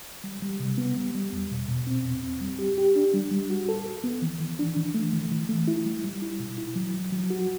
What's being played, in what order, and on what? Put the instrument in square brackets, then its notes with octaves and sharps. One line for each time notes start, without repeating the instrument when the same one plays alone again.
[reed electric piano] G3
G3
C3
B3
G3
G3
E2
B2
B2
C4
E2
C4
G3
G4
G4
D4
G3
G3
F#4
A4
A4
B3
E3
E3
D4
E3
A3
E3
E3
A3
E4
G3
G3
E4
B2
E4
F#3
F#3
F#3
F#4